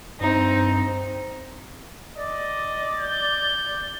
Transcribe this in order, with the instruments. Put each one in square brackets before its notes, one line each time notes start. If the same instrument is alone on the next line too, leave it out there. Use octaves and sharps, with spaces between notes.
[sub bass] G2 [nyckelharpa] C4 [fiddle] D#4
[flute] D5 [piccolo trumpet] D#5
[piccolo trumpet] G6